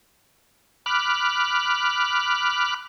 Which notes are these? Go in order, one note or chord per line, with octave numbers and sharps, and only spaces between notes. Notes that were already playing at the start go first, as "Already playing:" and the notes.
B5 D6 F6 F#6